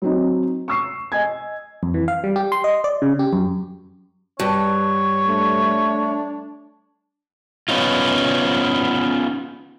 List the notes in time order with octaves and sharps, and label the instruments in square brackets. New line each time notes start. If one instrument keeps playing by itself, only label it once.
[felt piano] F#3 C4 D#4
C#6 E6 C7
D#5 G#5 G#6
[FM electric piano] F2
E3
F5
G3
G4
C6
D#5
D5
C#3
G4
F#2
[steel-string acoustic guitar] G2 [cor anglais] C#5
[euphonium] A3 [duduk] D4
[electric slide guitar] B3 C#4 D#4 F4